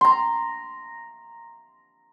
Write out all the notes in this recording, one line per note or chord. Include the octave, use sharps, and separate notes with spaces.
A#5 C6